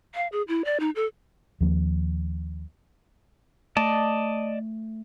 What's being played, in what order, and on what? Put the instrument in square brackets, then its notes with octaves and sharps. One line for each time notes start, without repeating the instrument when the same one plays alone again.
[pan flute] F5
G#4
E4
D5
D#4
A4
[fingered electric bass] D#2 F3 G3 A#3
[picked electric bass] A3 [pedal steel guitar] D5 D#5 A5